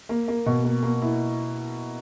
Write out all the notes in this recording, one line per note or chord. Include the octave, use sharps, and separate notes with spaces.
A#3
A#3
B2
A#3
A#3
E4